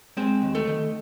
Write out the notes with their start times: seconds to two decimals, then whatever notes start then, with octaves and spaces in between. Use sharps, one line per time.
0.17 G#3 C4 C5
0.42 D#2
0.55 A3 A4
0.67 D#3